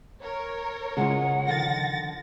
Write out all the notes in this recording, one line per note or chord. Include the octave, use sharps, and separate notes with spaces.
A#4 C#5
C#3 G#3 F4 F#5
D3 D#3 F3 A6 A#6